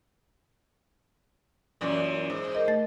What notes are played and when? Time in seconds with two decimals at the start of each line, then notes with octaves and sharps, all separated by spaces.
1.81 F#2 A#2 E3
2.30 G#2
2.55 A#4 D#5
2.68 A3 A6